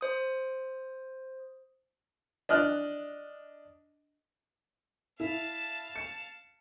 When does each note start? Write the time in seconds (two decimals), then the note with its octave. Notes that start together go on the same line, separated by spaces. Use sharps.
0.01 C5 D#6
2.49 D4 D#5 F6 F#6
5.20 E4 F5 A5
5.96 C#7